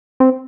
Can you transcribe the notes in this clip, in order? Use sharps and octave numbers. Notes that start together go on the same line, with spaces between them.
C4